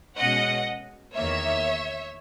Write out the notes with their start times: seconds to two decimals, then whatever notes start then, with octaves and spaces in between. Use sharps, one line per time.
0.17 B2 G#3 C#4 D#5 F#5
1.14 E2 D#3 A#3 C#5 E5